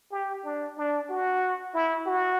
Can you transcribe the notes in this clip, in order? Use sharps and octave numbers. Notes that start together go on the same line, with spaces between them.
G4
D4
D4
F#4
E4
F#4